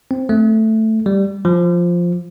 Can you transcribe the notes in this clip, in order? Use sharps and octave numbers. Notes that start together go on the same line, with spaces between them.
C4
A3
G3
F3